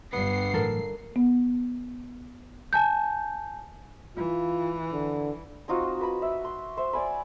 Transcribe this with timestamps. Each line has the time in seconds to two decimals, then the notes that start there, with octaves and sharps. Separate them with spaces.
0.13 G1 G2 B3 C7
0.54 A2 E3 F#3 A4 A#4
1.16 B3
2.73 G#5 A5 G6
4.17 E3 F4
4.93 D3
5.68 C4 D#4 F4 F#4
5.99 F#4 B4 B5
6.22 E5
6.44 C6
6.77 C5 E5
6.93 D5 G#5 B5